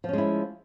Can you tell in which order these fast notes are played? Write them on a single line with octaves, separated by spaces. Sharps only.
F3 C#4 G#3 E4